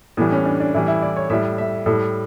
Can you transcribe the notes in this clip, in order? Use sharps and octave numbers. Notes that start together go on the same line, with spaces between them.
A2 E3 G3 B3
C#4
D4
D4
A2 E3 G3 E4
E4
D5
C#5
A2 G3 E5
E5
A2 G3 A4